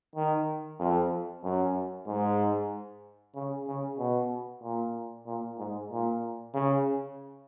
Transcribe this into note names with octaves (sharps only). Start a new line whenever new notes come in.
D#3
F2
F#2
G#2
C#3
C#3
B2
A#2
A#2
G#2
A#2
C#3